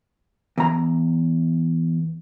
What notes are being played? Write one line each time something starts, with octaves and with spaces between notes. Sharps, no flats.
E2 A#5